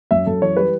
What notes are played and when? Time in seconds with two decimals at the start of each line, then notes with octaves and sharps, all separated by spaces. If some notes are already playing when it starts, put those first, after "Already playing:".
0.11 F#2 E5
0.26 F#2 A4
0.42 E3 C#5
0.57 G3 B4